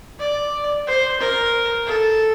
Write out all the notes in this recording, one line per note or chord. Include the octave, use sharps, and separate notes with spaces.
D5
C5
A#4
A4